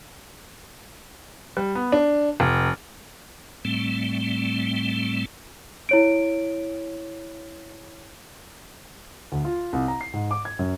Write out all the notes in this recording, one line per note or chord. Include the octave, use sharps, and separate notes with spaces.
G3
B3
D4
F1
A2 G3 A3 C4
E4 C#5 D7
D2
F4
C2
A#5
C7
G#2
D6
G#6
F#2